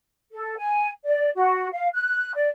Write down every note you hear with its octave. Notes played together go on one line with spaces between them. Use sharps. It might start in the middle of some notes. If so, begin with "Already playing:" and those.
A4
G#5
D5
F#4
F5
F#6
D5